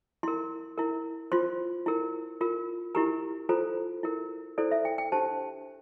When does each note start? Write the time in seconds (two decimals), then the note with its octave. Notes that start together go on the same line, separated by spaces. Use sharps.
0.23 E4 A#4 C6
0.78 E4 A#4
1.32 F4 C5 C6
1.86 E4 A#4
2.41 F4 A#4
2.95 E4 G4 A#4 A#5
3.49 F4 A4 C5 A#5
4.03 E4 A#4
4.58 E4 A4 C5 D5
4.71 E5
4.85 G5
4.98 G5
5.12 D4 G4 C5 A5